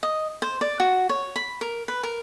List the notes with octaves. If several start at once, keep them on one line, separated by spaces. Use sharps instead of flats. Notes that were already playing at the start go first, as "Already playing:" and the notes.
D#5
C5
D5
F#4
C#5
B5
A#4
B4
A#4